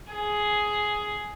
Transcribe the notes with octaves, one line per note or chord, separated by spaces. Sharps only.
G#4